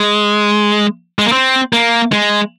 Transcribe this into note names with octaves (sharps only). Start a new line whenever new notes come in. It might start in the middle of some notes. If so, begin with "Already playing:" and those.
Already playing: G#3
G#3
A#3
C4
A#3
G#3